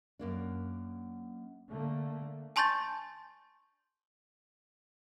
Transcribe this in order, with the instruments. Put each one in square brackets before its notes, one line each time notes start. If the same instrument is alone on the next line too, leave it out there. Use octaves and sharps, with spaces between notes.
[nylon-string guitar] F#2 A#3 D4
[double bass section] D3 A3 A#3
[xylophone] G#5 A5 C6 C#6 G6 A6